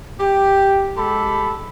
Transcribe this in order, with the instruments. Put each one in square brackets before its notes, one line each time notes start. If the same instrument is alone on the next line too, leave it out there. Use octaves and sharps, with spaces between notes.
[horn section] G4
G#3 G4 A4 B5